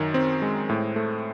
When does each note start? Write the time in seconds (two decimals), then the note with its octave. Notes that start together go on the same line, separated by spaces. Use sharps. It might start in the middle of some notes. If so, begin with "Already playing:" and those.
Already playing: F#2 D#3
0.14 C4
0.42 G#3
0.69 A2
0.96 A3